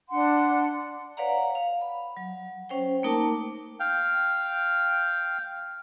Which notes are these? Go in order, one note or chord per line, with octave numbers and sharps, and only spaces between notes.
D4 F#5 C6
B4 C#5 D5 F5 F#5 A#5
F5
B5
F#3
C#4 C5 C#5 G5
A3 A#3 D#4 A#4 A5 D6
F5 G5